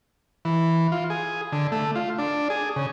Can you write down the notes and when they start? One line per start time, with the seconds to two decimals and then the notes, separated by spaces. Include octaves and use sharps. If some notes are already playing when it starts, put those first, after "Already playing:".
0.45 E3
0.92 F4
1.10 G#4
1.52 D3
1.72 A3
1.95 F4
2.19 D4
2.50 G#4
2.76 C#3